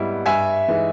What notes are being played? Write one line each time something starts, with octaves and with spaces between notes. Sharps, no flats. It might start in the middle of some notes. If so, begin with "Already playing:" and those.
Already playing: G#2 G3 B3 E4
G2 E5 G#5
E3 G#3 D#4